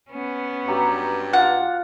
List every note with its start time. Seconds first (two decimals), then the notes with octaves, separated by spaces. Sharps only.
0.10 B3 C#4
0.68 G2 F#3 G4 A#5
1.33 F4 F#5